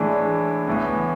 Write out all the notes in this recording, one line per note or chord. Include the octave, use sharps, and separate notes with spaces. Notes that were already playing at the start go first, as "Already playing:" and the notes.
Already playing: A2 E3 G#3 D4
A2 E3 B3